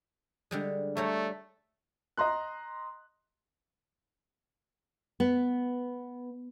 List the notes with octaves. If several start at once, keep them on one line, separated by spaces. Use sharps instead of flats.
D3 G3 G#3
G3 A3 C#5 A#5
D#5 A#5 C6 F#6
B3